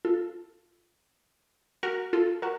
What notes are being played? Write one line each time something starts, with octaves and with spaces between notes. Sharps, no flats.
F4 A4
F#4 A#4
F4 A4
F#4 A#4